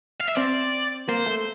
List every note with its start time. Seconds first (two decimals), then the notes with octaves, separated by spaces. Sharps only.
0.21 F5
0.29 E5
0.37 C4 D5
1.09 A#3 C5
1.26 A3